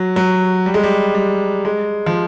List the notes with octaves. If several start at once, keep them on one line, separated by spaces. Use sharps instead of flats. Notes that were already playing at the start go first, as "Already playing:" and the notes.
Already playing: F#3
F#3
G3
G#3
G3
G3
G#3
F3